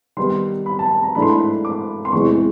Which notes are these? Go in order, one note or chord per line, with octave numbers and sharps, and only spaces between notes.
D#3 G3 B3 D#4 C6
B5
A5
A5
A#5
G#2 E3 A3 D4 B5
C6
B5
D6
C6
E2 C3 E3 G#3 C#6